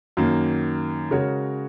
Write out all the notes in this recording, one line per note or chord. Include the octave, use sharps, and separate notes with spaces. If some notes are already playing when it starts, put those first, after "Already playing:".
F#2 D#3 A#3
C#3 G#3 F#4 A#4 C#5